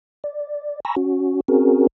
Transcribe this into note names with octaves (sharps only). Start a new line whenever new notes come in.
D5
G#5 A#5 B5 C#6 E6 A#6
C#4 F#4
C4 C#4 F#4 G#4 A#4